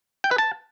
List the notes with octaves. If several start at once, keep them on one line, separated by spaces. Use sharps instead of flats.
G5
B4
A5